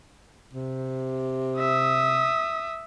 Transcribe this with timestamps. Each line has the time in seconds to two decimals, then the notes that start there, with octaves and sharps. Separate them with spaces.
0.53 C3
1.59 E5 D#6